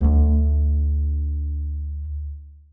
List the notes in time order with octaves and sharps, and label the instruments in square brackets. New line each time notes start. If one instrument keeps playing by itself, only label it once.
[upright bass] D2 D4